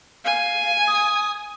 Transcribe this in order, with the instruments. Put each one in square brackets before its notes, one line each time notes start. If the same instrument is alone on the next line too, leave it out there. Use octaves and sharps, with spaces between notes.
[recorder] F5 [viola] G#5
[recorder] D#6